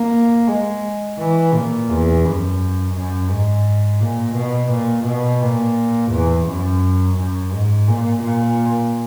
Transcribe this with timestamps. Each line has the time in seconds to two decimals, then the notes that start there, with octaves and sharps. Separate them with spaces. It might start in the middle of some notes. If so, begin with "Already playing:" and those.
Already playing: A#3
0.47 G#3
1.18 E3
1.54 A#2
1.89 E2
2.24 F#2
2.94 F#2
3.30 G#2
4.01 A#2
4.35 B2
4.71 A#2
5.05 B2
5.42 A#2
6.12 E2
6.47 F#2
7.17 F#2
7.52 G#2
7.88 A#2
8.23 A#2